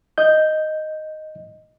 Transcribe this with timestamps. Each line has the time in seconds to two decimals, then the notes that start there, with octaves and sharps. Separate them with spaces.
0.18 D#5 G6